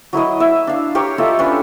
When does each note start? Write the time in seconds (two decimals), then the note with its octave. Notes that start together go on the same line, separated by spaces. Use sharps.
0.13 F#3 E4 A#4 D#5
0.40 E4 E5
0.67 D4 F5
0.95 G4 A#4 C#5
1.18 F4 A4 D#5 E5
1.39 C#4 D4 B4